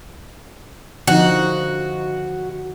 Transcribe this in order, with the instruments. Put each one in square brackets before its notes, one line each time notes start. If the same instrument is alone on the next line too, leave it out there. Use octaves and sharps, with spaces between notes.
[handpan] D3 F3 D#4 [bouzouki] F#4